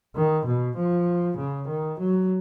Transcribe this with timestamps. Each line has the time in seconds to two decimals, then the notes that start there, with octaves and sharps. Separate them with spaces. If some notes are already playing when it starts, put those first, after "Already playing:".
0.16 D#3
0.46 B2
0.77 F3
1.37 C#3
1.68 D#3
1.99 F#3